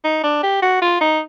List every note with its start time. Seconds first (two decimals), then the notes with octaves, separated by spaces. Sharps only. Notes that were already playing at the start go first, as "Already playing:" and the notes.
0.04 D#4
0.23 D4
0.43 G4
0.62 F#4
0.82 F4
1.01 D#4